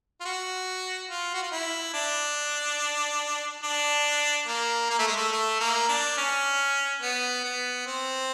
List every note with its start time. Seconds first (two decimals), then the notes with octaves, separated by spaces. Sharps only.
0.21 F4
0.25 F#4
1.10 F4
1.34 F#4
1.43 F4
1.52 E4
1.94 D4
3.64 D4
4.48 A#3
4.90 A#3
4.99 A3
5.08 G#3
5.16 A3
5.33 A3
5.61 A#3
5.89 D4
6.17 C#4
7.02 B3
7.44 B3
7.86 C4